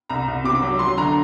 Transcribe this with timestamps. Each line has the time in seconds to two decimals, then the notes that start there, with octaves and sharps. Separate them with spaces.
0.10 C2 A#5
0.28 C2
0.44 C3 D6
0.62 F#3
0.79 F#3 C6
0.97 D3 A#5